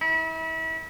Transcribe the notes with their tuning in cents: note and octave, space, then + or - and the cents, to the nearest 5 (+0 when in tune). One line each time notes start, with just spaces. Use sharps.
E4 -35